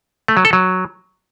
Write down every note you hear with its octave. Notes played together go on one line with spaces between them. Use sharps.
A3
F#3
A4
F#3